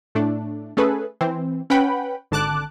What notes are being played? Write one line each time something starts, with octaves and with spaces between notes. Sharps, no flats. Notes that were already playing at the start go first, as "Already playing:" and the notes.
A2 A3 D4
A3 C#4 G#4 A4 B4
E3 C4
C#4 B4 F#5 G5 B5
G#1 D3 A5 D6 F#6